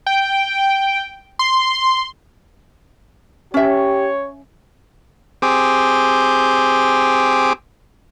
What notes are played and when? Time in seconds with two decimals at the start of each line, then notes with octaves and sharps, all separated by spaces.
0.06 G5
1.39 C6
3.54 C#4 G4 C#5 E5
5.42 C4 G4 G#4